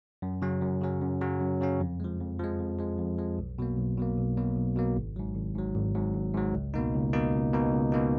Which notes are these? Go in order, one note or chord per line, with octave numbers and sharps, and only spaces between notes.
F#2
C#3 F#3 C#4
F#2
C#3 F#3 C#4
F#2
C#3 F#3 C#4
F#2
C#3 F#3 C#4
F2
F3 G#3
F2
F3 G#3
F2
F3 G#3
F2
F3 G#3
B1
B2 F#3 A#3
B1
B2 F#3 A#3
B1
B2 F#3 A#3
B1
B2 F#3 A#3
G#1
G#2 F#3
G#1
G#2 F#3
G#1
G#2 F#3
G#1
G#2 F#3
C#2
B2 A#3 D#4
C#2
B2 A#3 D#4
C#2
B2 A#3 D#4
C#2
B2 A#3 D#4